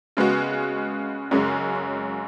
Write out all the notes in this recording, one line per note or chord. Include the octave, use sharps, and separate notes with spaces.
C#3 G#3 B3 F#4
F#2 C#3 G#3 C#4 G#4